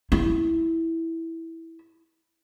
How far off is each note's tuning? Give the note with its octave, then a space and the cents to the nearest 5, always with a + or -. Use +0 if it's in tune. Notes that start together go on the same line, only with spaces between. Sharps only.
E4 -5